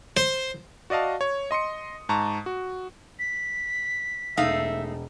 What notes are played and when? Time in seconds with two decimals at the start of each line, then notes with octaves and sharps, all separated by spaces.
0.17 C5
0.90 F#4 D5 D#5 F5 A5
1.21 C#5
1.51 D#5 C6 D#6 C#7
2.09 G#2 A5 A#5 C#6
2.46 F#4
3.19 B6
4.37 E1 A3 D#4 E5 F5